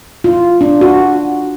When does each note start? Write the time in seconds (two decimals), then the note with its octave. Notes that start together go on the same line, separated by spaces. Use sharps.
0.24 F4
0.61 D4
0.81 F#4